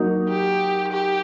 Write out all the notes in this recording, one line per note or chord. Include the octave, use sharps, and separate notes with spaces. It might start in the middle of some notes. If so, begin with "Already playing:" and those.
Already playing: F#3 A#3 D#4
G4
G4